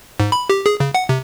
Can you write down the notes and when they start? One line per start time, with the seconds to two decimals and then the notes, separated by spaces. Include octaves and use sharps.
0.20 G#2
0.32 B5
0.49 G4
0.66 G#4
0.80 C#3
0.95 F#5
1.09 C3